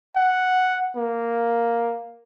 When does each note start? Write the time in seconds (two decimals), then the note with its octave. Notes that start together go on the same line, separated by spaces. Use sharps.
0.16 F#5
0.96 A#3